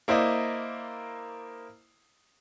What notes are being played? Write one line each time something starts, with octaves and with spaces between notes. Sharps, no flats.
A#3 E4 C5 D5 D#5